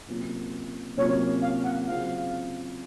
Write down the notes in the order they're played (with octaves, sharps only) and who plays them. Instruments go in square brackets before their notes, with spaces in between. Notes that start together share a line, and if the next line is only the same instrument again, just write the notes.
[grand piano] C3 F#3 A#3 C#4 F4
[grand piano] C3 F#3 A#3 C#4 F4 [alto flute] C#5
[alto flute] F5
F#5
[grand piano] C#3 F#3 C4 F4 [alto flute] F5